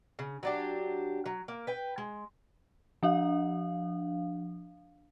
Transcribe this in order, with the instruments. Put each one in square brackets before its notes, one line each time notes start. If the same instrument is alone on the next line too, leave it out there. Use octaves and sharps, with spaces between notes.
[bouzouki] C#3
F#3 D4 G4
F#3
A#3
B4 G5
G#3
[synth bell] F3 D4 F5